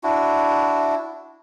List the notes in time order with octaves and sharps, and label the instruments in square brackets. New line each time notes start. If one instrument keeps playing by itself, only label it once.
[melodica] D4 E4 F#4